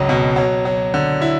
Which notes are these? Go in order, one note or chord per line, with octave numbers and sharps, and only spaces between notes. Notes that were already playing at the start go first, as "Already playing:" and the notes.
Already playing: G#1 C#2 F#3
B2
F#3
F#3
D3
E4